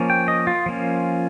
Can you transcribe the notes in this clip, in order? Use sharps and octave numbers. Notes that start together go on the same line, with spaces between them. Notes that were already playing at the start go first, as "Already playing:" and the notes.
Already playing: F3 A#3 C#4
G5
D#5
F4
F3 A#3 C#4